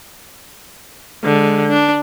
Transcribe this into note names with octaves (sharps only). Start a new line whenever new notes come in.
D3 G#3
D4